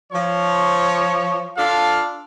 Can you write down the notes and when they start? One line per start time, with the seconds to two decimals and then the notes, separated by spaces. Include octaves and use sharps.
0.13 F3 C#5
1.57 D4 F4 A4 F5